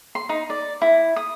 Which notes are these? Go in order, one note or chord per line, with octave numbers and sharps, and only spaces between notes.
C6
D#4
D5
E4
D#6